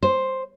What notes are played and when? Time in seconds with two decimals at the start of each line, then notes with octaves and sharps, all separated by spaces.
0.03 C5